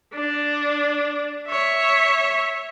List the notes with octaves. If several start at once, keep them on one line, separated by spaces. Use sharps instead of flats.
D4
C#5 E5